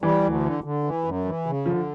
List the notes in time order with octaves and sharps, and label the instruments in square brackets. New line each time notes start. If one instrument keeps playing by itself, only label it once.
[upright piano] E3 [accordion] G3
[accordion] D2
D3
D3
E3
F#2
E3
C#3
[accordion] D3 [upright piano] F3